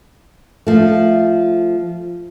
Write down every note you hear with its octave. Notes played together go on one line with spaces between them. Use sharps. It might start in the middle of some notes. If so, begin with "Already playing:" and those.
F3 A3